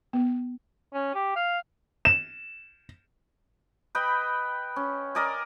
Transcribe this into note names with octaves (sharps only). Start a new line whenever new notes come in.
B3
C#4
G4
F5
E7
B4 D#5 G5 B5
C#4
A#4 D5 D#5 G#5